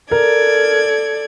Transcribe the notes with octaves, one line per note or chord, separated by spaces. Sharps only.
A4 A#4 D5 G#6